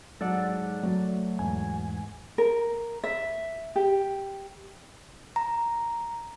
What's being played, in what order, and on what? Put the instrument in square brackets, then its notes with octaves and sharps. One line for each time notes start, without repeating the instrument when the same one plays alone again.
[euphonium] G#2 [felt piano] F#3 [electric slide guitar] A4 D5 F#5
[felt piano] F#3 [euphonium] A3
[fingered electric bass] E2 G#2 [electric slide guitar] G#5
[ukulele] A#4
E5
G4
[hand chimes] A#5